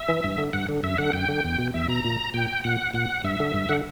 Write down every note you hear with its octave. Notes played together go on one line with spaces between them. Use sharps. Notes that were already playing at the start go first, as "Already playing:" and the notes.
Already playing: E5
E3
G2
D3
G2 F#5
D3
F#2 E5
D3 F#5
F#2 G5
D3
E2
B2
E2 E5
B2 A#5
A#2
A#2 G5
A#2 F#5
A#2 F#5
G2 E5
D3
G2
D3 F#5